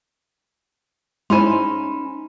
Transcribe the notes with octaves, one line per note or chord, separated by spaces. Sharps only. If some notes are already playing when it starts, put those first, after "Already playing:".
G#3 C#4 D#4 E4 C5 G#5 B5 C6